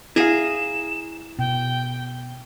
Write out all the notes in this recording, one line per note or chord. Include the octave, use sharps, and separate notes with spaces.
E4 G#4 F5 G#5 A#5 E7
B2 G5